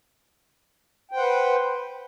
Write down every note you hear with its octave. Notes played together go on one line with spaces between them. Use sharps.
B4 C5 F#5 G5